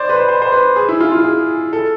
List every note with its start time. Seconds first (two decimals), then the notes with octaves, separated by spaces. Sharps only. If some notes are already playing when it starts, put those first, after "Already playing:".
Already playing: C5 D5
0.09 B4
0.16 C5
0.28 C5
0.42 C5
0.52 B4
0.76 G#4
0.89 E4
1.00 F4
1.12 F4
1.24 G#4
1.73 A4